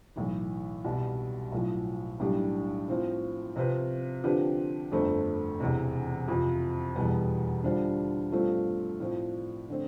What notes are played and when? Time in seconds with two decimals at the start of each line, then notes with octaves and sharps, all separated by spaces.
0.16 B1 A2 E3
0.84 C2 B2 G3
1.52 B1 A2 F3
2.20 B1 A2 G3 D4 G4
2.88 A2 F3 C4 F4
3.56 C3 F3 C4 F4 B4
4.24 D3 F3 C4 G4 B4
4.92 G1 F2 D3 A3 C4
5.60 E1 E2 C3
6.28 F2 C3 F3
6.96 E1 E2 B2 G3 B3
7.63 D3 G3 D4 F4 C5
8.32 G2 F3 A3 C4 F4
9.00 A2 F3 C4
9.69 D3 A3 C4